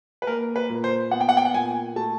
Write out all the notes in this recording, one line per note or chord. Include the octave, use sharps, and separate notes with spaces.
B4
A#3 A#4
B4
A#2
C5
B3 F#5
G5
F#5
G5
F#5
A#2 G#5
A3 A5